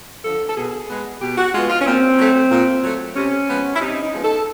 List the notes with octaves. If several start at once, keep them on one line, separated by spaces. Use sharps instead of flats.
D3 F3 A4
A4
B2 G#4
G#3 B3
B2 G4
F#4
G#3 B3 F4
F4
C#4
A#2 C4
F#3 A3
A#2
F#3 A3
C3 C#4
F3 G#3 B3
E4
C3 D#4
D#4
F3 G#3 B3
A4